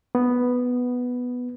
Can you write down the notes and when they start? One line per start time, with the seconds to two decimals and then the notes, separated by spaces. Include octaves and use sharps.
0.15 B3